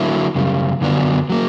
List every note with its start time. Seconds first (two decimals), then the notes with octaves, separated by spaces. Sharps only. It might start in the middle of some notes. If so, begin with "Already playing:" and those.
Already playing: D3 F#3 A#3 E4
0.35 F#2 C#3 G3
0.81 F#2 D3 F#3 B3 D4
1.30 F#3 A#3